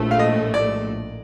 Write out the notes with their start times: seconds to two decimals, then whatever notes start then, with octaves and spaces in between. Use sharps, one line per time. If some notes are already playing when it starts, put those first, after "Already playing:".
Already playing: A#1 A2 A3
0.11 F5
0.19 D#5
0.54 D5